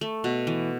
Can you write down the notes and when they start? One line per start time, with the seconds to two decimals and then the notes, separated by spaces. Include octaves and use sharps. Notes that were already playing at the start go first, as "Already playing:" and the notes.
0.01 A3
0.24 B2
0.47 E3